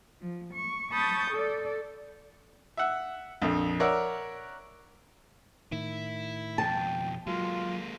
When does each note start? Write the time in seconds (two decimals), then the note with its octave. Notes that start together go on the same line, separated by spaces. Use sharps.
0.20 F3
0.52 C#6
0.92 A5 B5 C#6 D#6 G6 A6
1.30 A4 D5
2.77 E5 F#5
3.42 A#1 F2
3.80 A#4 C#5 D5 E5 F#5
5.72 A2 D#3 E4
6.58 F2 B2 G5 A5
7.27 F#3 G#3 A#3 F4